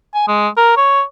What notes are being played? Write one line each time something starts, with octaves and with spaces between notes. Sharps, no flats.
G#5
G#3
A#4
C#5